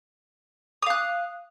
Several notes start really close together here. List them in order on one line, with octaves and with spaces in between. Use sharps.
D#6 F5 F#6